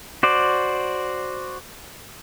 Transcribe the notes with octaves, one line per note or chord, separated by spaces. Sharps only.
F#4 C5 D5